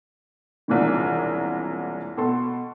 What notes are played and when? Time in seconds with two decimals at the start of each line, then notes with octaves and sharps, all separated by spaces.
0.68 E1 C2 A#2 D#3
2.17 B2 A4 C6